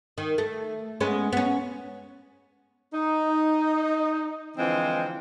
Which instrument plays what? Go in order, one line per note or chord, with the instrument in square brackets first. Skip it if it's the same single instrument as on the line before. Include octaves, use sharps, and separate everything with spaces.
[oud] D#3
A3
G#3 B3 C#4
B3 C#4
[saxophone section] D#4
D3 E3 F3 G#3 C4